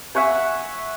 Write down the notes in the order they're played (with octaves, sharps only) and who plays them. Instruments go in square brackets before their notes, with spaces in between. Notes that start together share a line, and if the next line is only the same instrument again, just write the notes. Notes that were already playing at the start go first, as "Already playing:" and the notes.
[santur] E5 F#5 G#5 C#6